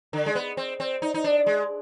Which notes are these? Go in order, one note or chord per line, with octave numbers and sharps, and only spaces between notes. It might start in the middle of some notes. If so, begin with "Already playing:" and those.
D3
G#3
B3
C4
C4
D#4
D#4
D4
G#3